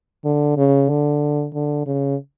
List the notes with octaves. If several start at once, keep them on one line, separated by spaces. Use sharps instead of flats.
D3
C#3
D3
D3
C#3